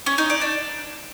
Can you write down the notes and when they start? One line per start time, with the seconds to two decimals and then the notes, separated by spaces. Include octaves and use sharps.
0.06 C#4
0.18 D#4
0.30 D5
0.41 D4